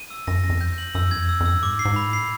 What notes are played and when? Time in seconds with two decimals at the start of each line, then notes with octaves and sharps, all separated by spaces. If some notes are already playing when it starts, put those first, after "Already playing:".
Already playing: D#7
0.10 E6
0.27 F#2 A#6
0.44 E2 A#6
0.49 F2
0.61 G6
0.78 F#7
0.95 F#2 E6
1.08 E2 G#6
1.18 F2
1.29 E6
1.40 F2
1.46 E6
1.54 G2
1.63 G#2 D6
1.79 C7
1.85 G#2
1.96 B5
2.07 A2
2.13 C7